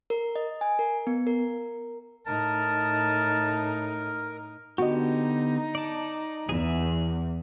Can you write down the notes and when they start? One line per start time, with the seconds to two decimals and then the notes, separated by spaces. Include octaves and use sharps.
0.10 A#4
0.36 D#5
0.61 G#5
0.79 A#4
1.07 B3
1.27 A#4
2.26 A2 D#4 A#4 A5
4.78 D3 B3 D#4 F#4 G4 D#5
5.75 D5 A5
6.49 E2 G#4 E5